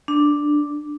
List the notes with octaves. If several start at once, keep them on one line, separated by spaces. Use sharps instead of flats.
D4